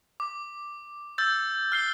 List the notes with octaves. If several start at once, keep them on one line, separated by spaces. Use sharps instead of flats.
D6
E6 G6 A6
F6 C7 G7